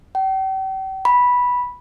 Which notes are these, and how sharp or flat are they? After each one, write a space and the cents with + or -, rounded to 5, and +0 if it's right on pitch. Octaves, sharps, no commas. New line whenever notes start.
G5 -40
B5 -10